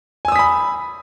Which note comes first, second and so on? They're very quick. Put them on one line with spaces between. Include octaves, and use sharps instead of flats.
G#5 E6 D#6 B6 B5